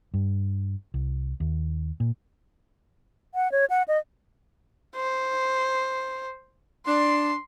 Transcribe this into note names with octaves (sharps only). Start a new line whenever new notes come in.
G2
C2
D#2
A#2
F#5
C#5
F#5
D#5
C5
D4 C6